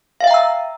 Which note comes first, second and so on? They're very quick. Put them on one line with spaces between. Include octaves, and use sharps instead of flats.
F5 E5 G5 A#5 E6